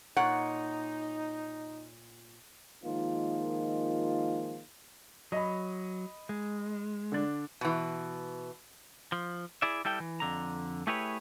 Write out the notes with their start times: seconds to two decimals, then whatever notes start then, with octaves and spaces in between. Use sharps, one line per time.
0.17 A#2 D#4 C#5 F#5
2.84 D#3 F3 G#3 A#3 D#4 F4
5.32 F#3 D#5 B5
6.29 G#3
7.12 D3 D4
7.61 B2 E3
9.12 F3
9.62 E4 G#4 D5 E5
9.85 G3 E4 A4 G5
10.00 E3
10.20 F2 D3 A#5
10.87 A3 E4 G4 G#4 B4 C#5